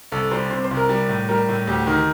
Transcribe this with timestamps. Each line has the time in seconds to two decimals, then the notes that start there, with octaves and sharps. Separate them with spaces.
0.12 C2 A4
0.31 G3 C5
0.50 C3 C5
0.64 C5
0.71 C2
0.77 A#4
0.89 G3
1.09 A2
1.28 G3 A#4
1.49 A2
1.67 D2 G4
1.87 D#3